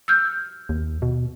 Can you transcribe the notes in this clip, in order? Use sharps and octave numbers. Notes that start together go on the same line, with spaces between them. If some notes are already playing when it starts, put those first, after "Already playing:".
E6 F6 G6
D#2
B2